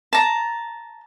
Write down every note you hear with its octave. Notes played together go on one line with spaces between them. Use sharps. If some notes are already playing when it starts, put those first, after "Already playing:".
A5 A#5